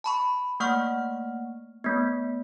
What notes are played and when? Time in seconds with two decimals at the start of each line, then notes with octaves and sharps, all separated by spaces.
0.04 A5 B5 C#6
0.60 A3 A#3 F#5 C#6 F6
1.84 A3 B3